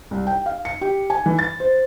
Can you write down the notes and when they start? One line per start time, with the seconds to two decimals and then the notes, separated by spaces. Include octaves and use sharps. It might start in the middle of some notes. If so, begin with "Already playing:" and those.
0.11 C2
0.27 G5
0.46 F5
0.65 C#7
0.81 G4
1.10 G#5
1.26 E3
1.39 A6
1.60 C5